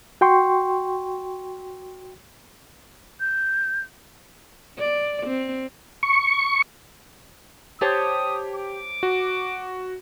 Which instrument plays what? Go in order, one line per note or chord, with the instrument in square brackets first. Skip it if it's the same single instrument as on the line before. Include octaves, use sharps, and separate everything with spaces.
[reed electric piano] F#4 G5 C6 C#6
[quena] G6
[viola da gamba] D5
C4
[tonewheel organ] C#6
[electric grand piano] G4 [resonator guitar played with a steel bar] C5 C#5 A5 [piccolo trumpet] D#6
[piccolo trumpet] D6
[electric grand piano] F#4